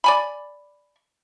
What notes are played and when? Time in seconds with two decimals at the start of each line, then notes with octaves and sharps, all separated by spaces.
0.04 D5 G#5 B5